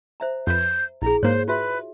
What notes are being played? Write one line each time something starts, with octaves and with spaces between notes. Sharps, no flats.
C5 E5 A#5
F2 B4 G6
A#1 E4 G#4 A#5
G#2 A#3 C5 C#5
F4 F#4 B4 E5